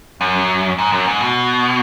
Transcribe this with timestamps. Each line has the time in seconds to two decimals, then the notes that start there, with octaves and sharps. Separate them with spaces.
0.21 F#2
0.78 G#2
0.92 F#2
1.07 G#2
1.21 B2